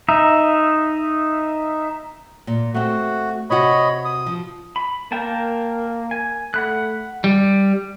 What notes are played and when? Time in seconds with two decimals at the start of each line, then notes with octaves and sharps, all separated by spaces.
0.09 D#4 E5
2.47 A#2
2.74 A3 C4 F#4
3.50 C3 F#4 C#5 D#5 B5
4.05 D#6
4.26 F3
4.76 B5
5.12 A#3 A#4 G5 A5
6.11 G#5
6.54 A3 F#5 B5 F#6
7.24 G3